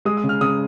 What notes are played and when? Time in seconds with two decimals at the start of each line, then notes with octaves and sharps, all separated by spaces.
0.05 G#3 D#6
0.17 D#6
0.23 C#3
0.29 F6
0.41 C#3 D#6